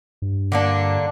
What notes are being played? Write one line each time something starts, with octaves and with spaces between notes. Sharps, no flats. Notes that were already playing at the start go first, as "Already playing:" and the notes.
G2
D3 A#3 D4